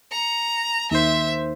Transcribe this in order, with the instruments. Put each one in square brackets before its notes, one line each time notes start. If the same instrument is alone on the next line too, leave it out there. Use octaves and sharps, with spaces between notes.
[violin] A#5 [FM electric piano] C#7
[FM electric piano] D#2 D#3 C5 [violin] E5